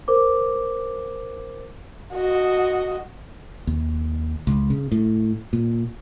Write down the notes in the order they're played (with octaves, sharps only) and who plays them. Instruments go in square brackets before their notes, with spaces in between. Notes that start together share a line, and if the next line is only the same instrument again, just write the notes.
[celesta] A#4 C5 D6
[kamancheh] F#4 D#5
[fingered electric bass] D#2
C#2
C#3
A2
A#2